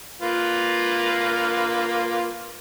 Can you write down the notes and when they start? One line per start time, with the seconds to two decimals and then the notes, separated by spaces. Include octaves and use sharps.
0.22 A#3 F4 B4